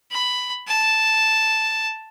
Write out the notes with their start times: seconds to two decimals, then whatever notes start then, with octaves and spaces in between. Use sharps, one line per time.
0.12 B5
0.67 A5